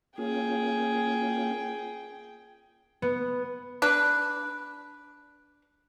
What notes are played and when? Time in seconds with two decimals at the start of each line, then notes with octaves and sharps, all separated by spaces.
0.18 A#3 C#4 F4 G#4 G5
3.02 B3
3.82 D4 B4